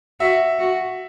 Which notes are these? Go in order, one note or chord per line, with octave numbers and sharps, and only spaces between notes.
F#4 E5
F#4